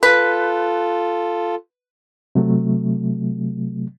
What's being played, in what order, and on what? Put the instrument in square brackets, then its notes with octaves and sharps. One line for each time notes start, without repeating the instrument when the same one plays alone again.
[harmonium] F4 A4 [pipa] B4
[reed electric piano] C3 F#3 A3